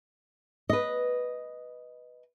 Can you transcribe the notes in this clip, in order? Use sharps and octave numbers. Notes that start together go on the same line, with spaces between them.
B4 D#5